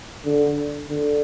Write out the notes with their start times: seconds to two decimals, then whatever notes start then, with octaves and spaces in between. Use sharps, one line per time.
0.25 D3
0.89 D3